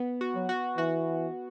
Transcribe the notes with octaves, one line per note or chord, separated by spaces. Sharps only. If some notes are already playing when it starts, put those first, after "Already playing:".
Already playing: B3
F#4
F#3
F#4
E3 F#4